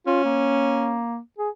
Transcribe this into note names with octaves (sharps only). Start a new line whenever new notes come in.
C#4 F4
A#3
G#4